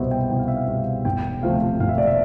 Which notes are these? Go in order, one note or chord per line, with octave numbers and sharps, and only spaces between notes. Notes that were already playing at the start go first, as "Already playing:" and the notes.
Already playing: C2 B2 G3 B3 C5 E5
G5
C2 G5
F5
E5
F5
B2 G3 B3 F5
E1 G5
D2 C3 F3 A3 F5
E1 F5
E5
D5
E5